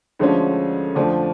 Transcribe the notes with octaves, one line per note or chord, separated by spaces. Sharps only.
D2 D3 F3 G#3 C#4
F2 D3 F3 A3 D4